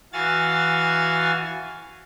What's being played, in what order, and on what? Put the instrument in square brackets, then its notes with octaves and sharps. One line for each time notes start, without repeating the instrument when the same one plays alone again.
[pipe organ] E3 F#4 F5 G#5 A6